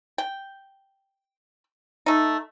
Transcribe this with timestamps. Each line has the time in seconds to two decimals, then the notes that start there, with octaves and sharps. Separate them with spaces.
0.18 G5
2.06 A3 D#4